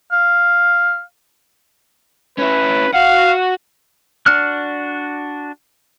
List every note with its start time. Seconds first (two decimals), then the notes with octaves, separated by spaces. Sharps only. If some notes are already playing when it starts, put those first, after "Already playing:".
0.12 F5
2.38 C#4 E4 B4
2.93 F#4 F5 F#5
4.26 D4 F#4 D5 F6 F#6